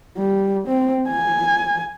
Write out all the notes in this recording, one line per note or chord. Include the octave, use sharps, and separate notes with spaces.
G3
C4
G#5